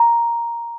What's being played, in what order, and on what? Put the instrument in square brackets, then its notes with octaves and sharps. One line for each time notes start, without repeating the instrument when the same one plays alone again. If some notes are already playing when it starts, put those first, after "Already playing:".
Already playing: [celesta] A#5